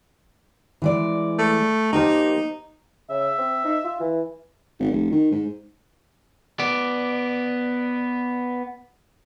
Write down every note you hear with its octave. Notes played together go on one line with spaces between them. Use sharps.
E3 G#3 D5
A3
F3 A#3 D#4 G4
C#3 E5
C4
D#4
F4
E3
G#1
F1
D#3
G#2
B3 D5